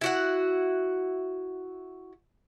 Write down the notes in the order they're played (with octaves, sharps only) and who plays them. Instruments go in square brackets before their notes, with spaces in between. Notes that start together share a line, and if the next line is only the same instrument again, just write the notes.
[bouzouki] E4 F#4 F#5